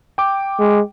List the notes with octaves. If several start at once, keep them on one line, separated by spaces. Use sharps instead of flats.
G5 D6
G#3